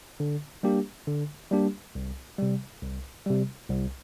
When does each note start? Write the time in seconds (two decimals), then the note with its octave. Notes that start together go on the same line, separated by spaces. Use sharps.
0.20 D3
0.63 G3 A#3 D4 G4
1.07 D3
1.51 G3 A#3 D4 G4
1.95 C2
2.39 C3 G3
2.82 C2
3.26 C3 G3
3.70 C2